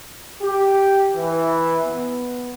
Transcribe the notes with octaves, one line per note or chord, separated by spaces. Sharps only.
G4
E3
B3